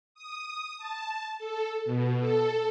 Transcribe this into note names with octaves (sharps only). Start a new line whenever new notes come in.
D#6
A5
A4
B2
A4